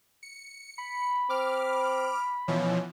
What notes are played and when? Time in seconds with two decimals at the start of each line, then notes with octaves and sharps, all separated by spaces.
0.23 C#7
0.78 B5
1.29 C4 D6 F6
2.48 B2 E3 F3 C#4